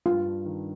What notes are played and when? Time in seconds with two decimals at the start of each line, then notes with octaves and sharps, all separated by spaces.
0.06 G2 F4
0.26 D4
0.45 D#3